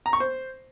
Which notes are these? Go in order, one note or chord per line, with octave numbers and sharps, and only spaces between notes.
A#5
C#6
C5